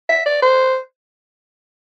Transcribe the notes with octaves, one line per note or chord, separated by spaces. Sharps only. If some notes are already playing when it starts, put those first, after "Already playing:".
E5
D5
C5